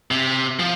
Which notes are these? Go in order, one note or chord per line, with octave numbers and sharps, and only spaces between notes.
C3
F3